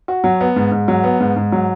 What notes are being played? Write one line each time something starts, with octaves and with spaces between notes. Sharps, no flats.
F#4
F#3
B3
G#2
G#2
F#3
B3
G#2
G#2
F#3